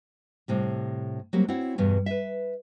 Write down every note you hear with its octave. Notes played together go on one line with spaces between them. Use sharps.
A2 C3 G3
F#3 G3 A#3 C4 G4
C4 E4 F#4 C#5 F#5
E2 G2 B2
B4 E5